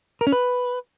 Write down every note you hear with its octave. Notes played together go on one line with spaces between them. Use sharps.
A#4
C#4
B4